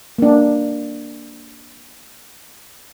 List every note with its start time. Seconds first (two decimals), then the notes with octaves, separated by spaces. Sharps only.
0.18 A#3 D4